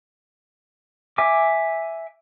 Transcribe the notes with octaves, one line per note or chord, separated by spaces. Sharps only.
E5 G#5 D6